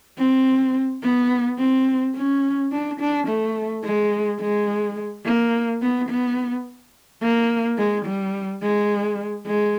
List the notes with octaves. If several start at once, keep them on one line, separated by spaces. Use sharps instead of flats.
C4
B3
C4
C#4
D4
D4
A3
G#3
G#3
A#3
B3
B3
A#3
G#3
G3
G#3
G#3